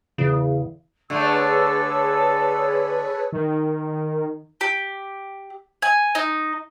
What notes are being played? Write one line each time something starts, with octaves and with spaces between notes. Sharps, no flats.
E2 C#3
D3 A3 G#4 A4 B4 C#5 E6
D#3
G4
G#5
D#4